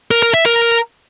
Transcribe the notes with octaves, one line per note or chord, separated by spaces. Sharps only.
A#4
A#4
E5
A#4